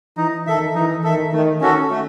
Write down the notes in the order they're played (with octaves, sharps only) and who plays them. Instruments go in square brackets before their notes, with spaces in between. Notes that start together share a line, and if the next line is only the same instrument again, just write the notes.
[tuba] E3 [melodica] D#4
[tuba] D#3 [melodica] A4 E5
[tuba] E3 [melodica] D#4
[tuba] D#3 [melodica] A4 E5
[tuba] D#3 [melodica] A3
[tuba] D#3 [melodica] C#4 F#4 A4
[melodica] A3